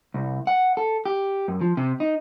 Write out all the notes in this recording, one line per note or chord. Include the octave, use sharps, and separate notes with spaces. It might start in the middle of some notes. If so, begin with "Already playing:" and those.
C2
F#5
A4
G4
F#2
F3
C3
D#4